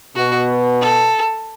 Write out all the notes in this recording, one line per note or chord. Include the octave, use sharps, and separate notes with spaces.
B2 F#4
A4